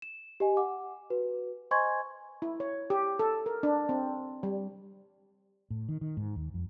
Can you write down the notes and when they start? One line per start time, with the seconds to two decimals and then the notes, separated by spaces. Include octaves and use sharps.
0.02 E7
0.40 G4 D#5 G#5
0.57 F#5 D6
1.10 F#4 B4
1.71 C5 D#5 G#5 C6 C#6 G#6
2.42 E4
2.60 C#5
2.90 G4
3.19 A4
3.46 A#4
3.63 D4
3.89 C4
4.43 G3
5.70 A2
5.89 D#3
6.01 D#3
6.17 G#2
6.36 D#2
6.54 F2